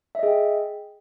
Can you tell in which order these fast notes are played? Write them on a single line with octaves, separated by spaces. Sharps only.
E5 D#5 G#4 G5